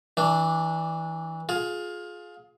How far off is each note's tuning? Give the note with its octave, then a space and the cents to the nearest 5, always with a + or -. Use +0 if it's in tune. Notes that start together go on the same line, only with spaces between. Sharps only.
E3 -25 D4 +0
F4 +20 G#4 +20